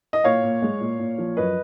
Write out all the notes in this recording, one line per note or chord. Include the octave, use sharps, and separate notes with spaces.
D#5
A#2 C#5 F5
A#2
G#3
A#2
A#2
F3
F#2 B4 D#5